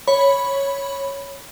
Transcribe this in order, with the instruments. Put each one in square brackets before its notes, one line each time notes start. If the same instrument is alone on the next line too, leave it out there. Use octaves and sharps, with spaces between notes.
[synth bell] C#5 B5